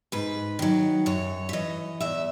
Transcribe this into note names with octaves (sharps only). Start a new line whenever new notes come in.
G#2 B4
D#3 F#3
F#2 C#5
E5
E3 D#5
E2 E5